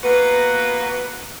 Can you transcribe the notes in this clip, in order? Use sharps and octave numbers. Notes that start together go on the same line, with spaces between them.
A#3 B3 F#4 B4